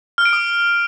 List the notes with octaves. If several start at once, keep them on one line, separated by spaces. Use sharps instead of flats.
F6
D7
D#6